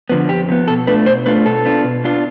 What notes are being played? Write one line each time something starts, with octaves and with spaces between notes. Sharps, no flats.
D3 F3 B3
F2 G4
D3 F3 B3
B2 A4
A3 D4 F4 B4
B2 C5
A3 D4 F4 B4
B2 A4
B3 D4 F4
B2
B3 D4 F4